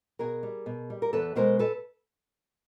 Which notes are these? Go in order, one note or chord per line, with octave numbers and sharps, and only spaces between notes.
B2 G#4 A#4
G3
B2
G3
A#4
E2 A4 B4
B2 G#3 A#4 C5
A4 B4